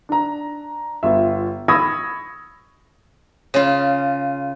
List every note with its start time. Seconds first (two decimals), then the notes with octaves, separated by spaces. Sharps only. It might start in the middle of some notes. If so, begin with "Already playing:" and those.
0.09 D4 A#5
1.03 G1 F4 E5
1.68 B5 C#6 D#6 E6 G#6 A#6
3.54 C#3 F4